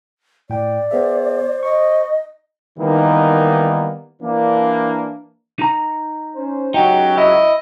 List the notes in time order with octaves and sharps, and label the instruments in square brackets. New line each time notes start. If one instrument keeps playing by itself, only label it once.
[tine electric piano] A2 G5 [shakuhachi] D5
[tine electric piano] B3 G#4 E5 [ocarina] C5
[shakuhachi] D#5 [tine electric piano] C#6
[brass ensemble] D#3 E3 G3 A#3 B3 D#4
E3 A#3 D4
[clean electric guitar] D#4 A#5
[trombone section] C#4 C5
[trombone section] C#2 C#3 F#3 [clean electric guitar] D#4 [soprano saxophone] G4
[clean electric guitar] E4 [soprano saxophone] D#5